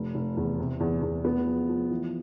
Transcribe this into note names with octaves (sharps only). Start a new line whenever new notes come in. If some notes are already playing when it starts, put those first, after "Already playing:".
Already playing: F1
F1
E2
C3
E2
E2
B3
F3
F3
E3